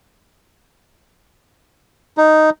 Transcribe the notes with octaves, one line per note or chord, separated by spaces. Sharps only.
D#4